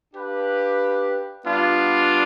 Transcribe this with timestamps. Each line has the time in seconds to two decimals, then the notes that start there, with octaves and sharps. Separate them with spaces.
0.14 D4 G4 B4 F5
1.45 G3 B3 D4 F4